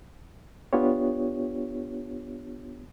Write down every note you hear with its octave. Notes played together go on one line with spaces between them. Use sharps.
B3 D4 F4 G4 C#5